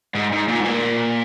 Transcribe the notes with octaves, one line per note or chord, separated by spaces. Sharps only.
G#2
G#2
A#2
G#2
A#2